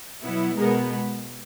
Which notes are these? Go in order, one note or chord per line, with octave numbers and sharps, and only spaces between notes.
B2 F#3 B3 E4
B2 G#3 B3 G#4 A#4